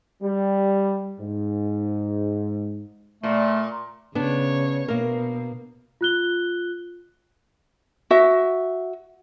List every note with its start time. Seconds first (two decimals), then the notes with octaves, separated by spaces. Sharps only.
0.23 G3
1.20 G#2
3.23 A#2 A3
4.15 C#3 B3 D4 C#5
4.88 B2 A#3 A#4
6.01 F4 F#6 G7
8.11 F#4 E5